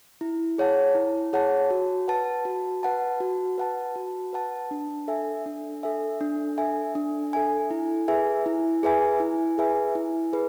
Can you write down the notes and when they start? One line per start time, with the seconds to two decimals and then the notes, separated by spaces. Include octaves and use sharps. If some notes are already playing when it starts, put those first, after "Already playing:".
0.21 E4
0.58 G#4 C#5 F#5 A5
0.95 E4
1.33 G#4 C#5 F#5 A5
1.70 F#4
2.08 B4 F#5 A5
2.45 F#4
2.83 B4 F#5 A5
3.20 F#4
3.58 B4 F#5 A5
3.96 F#4
4.33 B4 F#5 A5
4.71 D4
5.08 A4 E5 G#5
5.46 D4
5.83 A4 E5 G#5
6.21 D4
6.58 A4 E5 G#5
6.95 D4
7.33 A4 E5 G#5
7.71 E4
8.08 G#4 B4 E5 G#5
8.46 E4
8.83 G#4 B4 E5 G#5
9.20 E4
9.58 G#4 B4 E5 G#5
9.95 E4
10.33 G#4 B4